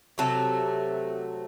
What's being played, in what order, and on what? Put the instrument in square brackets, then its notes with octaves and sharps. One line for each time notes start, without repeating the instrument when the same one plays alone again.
[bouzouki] C3 F#3 A3 A4